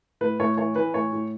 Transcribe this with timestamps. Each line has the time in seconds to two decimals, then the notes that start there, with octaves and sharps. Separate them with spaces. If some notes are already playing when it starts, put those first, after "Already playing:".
0.21 A2 B4
0.40 A2 C#5
0.57 E3 C#5
0.75 E3 B4
0.94 A2 C#5
1.12 A2